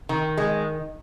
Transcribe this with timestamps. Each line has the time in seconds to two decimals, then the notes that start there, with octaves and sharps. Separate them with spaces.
0.09 D#3
0.37 G#3